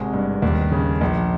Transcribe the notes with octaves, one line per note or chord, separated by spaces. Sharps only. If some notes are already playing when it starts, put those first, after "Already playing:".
Already playing: G#1 C3 G#3 G#4
G2
D#2
C#3
A#1